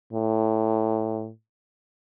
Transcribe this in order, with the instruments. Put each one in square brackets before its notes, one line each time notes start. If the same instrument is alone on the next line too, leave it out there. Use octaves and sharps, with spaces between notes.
[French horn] A2